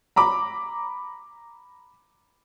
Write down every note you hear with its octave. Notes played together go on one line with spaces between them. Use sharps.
A#5 B5 D6